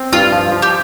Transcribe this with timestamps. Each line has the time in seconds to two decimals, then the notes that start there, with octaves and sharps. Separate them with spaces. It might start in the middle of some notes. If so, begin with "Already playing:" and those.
Already playing: C4
0.13 G2 F4
0.32 F3
0.52 F3
0.62 G4